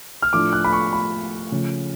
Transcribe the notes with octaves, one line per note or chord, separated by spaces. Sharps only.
F6
A2 F3 A3 D4 D6
F#6
B5
C#6
B5
C#3 F3 A3 C#4